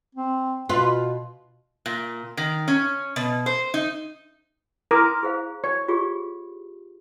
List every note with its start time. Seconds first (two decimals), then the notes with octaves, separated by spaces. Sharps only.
0.15 C4
0.69 B2 F4 B4
1.86 A#2
2.37 D#3
2.68 C#4
3.16 B2
3.46 C5
3.74 D#4
4.91 E4 A#4 C6 D6 D#6
5.23 G#4 C5 F5
5.64 C#5
5.88 F4 G4 G#4